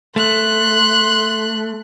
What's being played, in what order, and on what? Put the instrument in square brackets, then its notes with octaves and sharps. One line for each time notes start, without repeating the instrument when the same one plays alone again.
[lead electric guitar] A3 [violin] C6 F#6